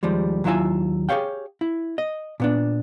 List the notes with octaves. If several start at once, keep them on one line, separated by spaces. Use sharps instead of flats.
D#2 F3 G3 G#3
D#2 F#3 E4 F4 E5 G#5
G4 G#4 B4 C#5 F5 G5
E4
D#5
A#2 B3 D4